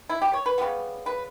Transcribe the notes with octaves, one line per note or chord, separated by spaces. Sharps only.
E4
G4
C#5
B4
C#3 G3 B3
B4